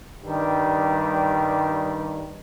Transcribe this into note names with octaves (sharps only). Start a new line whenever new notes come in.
G2 D#3 G3